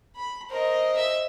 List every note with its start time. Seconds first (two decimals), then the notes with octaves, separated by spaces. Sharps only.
0.16 B5
0.50 A#4 C5 D#5
0.96 E5